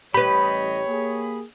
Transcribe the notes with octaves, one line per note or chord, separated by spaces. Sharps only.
A1 G3 G4 B4 C#5 D#5 B5
A#3 G#4